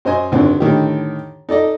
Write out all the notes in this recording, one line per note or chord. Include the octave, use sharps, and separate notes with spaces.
F#2 C5 D#5 G#5
G#1 C#2 F#2 D3 C4
A2 D3 D#3 G4
D#4 A4 D5 D#5